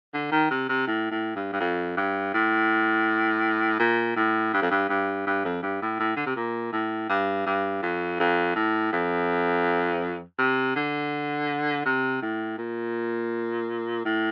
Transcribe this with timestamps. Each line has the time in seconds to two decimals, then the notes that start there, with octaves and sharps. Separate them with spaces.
0.14 D3
0.32 D#3
0.51 C3
0.69 C3
0.87 A2
1.12 A2
1.36 G2
1.53 G2
1.60 F2
1.97 G2
2.34 A2
3.80 A#2
4.16 A2
4.54 G2
4.62 F2
4.71 G2
4.89 G2
5.27 G2
5.45 F2
5.63 G2
5.82 A2
6.00 A2
6.16 D3
6.26 C3
6.36 A#2
6.73 A2
7.10 G2
7.46 G2
7.83 F2
8.20 F2
8.56 A2
8.93 F2
10.39 C3
10.76 D3
11.85 C3
12.22 A2
12.58 A#2
14.05 A2